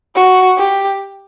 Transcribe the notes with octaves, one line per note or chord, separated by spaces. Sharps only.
F#4
G4